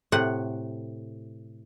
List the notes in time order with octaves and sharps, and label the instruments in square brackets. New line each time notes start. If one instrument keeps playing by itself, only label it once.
[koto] A2 C3 F#5